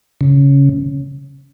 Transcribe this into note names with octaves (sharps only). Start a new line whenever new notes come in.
C#3